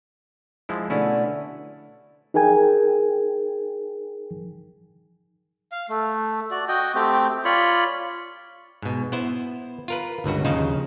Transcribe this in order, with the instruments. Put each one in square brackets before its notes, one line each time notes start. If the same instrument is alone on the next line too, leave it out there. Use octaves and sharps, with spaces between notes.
[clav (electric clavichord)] F3 G#3 E4
[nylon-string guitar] B2 D3 A3 [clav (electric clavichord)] C#4 E4
[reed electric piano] D#4 G#4 A#4 G5 G#5
[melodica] F5
A3
F#4 D5
F#4 D#5 G5
A3 C4 G4
F4 C#5 D5 B5
[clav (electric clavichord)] G#2 B2
B3 E4 C5
F4 A#4 B4
G1 C#2 G2 F#4
D#2 C#3 F3 D#4 C5